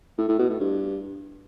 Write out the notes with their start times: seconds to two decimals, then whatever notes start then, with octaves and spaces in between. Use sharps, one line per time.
0.18 A2
0.28 A2
0.39 B2
0.49 A2
0.60 G2